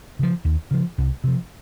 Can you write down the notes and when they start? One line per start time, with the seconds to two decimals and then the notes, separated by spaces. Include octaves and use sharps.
0.19 C#3 F3
0.44 D#2
0.71 C#3 F3
0.98 C2
1.24 C3 F3